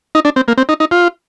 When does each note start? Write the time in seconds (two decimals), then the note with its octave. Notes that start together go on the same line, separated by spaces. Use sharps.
0.15 D#4
0.25 D4
0.36 C4
0.48 A#3
0.58 C4
0.69 D#4
0.80 D#4
0.91 F4